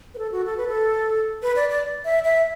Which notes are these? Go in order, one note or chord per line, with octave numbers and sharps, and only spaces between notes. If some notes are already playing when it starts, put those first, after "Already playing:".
B4
A4
F#4
A4
B4
A4
B4
D5
D5
E5
E5